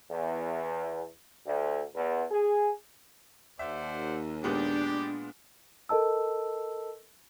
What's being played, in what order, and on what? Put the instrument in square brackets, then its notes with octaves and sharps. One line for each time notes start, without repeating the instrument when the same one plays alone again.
[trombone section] E2
D2
E2
G#4
[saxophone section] D#2 [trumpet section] C5 D5 F#5 [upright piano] E5
[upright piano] A#2 G#3 B3 [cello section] D4 [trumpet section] G4
[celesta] A4 A#4 D#5 A5 E6